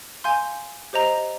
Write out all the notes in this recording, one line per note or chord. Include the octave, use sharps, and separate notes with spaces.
F5 G#5 C6 G6
G4 C5 D#5 A#5